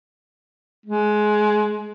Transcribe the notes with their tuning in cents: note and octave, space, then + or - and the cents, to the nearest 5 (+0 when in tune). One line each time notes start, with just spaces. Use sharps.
G#3 +20